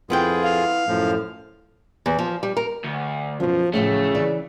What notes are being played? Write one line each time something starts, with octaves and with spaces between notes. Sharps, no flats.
F2 B3 E4 F4 G#4 G5
F5
F#2 A2 F3
E2
F3
G3
A#4
D2
F#2 B2 F3
A2 C#3 F3 F#3 A3
E3 C#4 D5